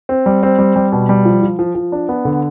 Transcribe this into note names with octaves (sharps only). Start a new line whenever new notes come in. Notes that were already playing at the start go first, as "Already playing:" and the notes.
C4
G3
C4
G3
G3
B2
G3
F3
F3
F3
F3
D4
B3
D3